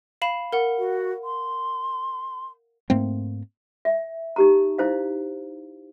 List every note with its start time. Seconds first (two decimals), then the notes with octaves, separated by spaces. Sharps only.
0.22 F5 B5 E7
0.53 A#4 F#5
0.78 F#4
1.24 C6
2.90 G#2 A3 A#3 C4
3.85 E5
4.36 D#4 G4 A#5
4.78 D#4 E4 C5 F5